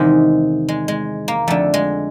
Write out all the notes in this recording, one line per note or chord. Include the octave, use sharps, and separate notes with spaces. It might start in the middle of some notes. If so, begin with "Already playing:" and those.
Already playing: E2 C3 D#3 G#3
G#3
G#3
A#3
F2 D3 A3
G#3